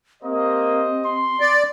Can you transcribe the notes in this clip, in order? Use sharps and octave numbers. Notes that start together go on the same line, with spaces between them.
A#3 C4 G4 C5 D#5
C6
D5